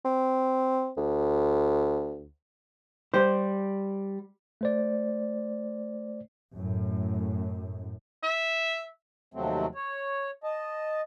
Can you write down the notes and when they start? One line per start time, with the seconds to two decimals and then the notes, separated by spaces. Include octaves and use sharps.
0.05 C4
0.97 D2
3.14 G3 G4 C5
4.61 A3 C5 D5
6.55 F#2 A2
8.23 E5
9.34 D#2 C3 F3 F#3 A3 C4
9.75 C#5
10.44 D#5 A5